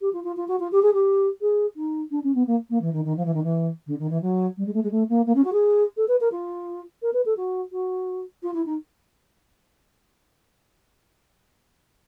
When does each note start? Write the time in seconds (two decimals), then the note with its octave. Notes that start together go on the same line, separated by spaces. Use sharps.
0.01 G4
0.13 F4
0.23 F4
0.36 F4
0.48 F#4
0.59 F4
0.71 G4
0.82 G#4
0.93 G4
1.41 G#4
1.76 D#4
2.11 D4
2.23 C#4
2.34 B3
2.47 A#3
2.69 A#3
2.81 E3
2.92 D#3
3.04 D#3
3.16 F3
3.25 E3
3.33 D#3
3.43 E3
3.86 D3
3.98 D#3
4.09 E3
4.21 F#3
4.57 G3
4.66 G#3
4.73 A3
4.83 G#3
4.91 A3
5.09 A#3
5.26 A#3
5.35 C#4
5.44 F#4
5.52 G#4
5.97 A4
6.08 B4
6.20 A#4
6.31 F4
7.02 A#4
7.13 B4
7.25 A4
7.36 F#4
7.72 F#4
8.42 F4
8.53 E4
8.65 D#4